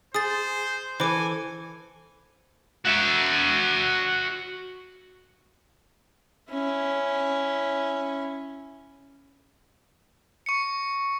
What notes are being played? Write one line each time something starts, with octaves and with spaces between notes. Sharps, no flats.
G#4 C5 D#6 A6
E3 A4 C5 G#5 D6
F#4 E5
C#4 E4
C#6 C#7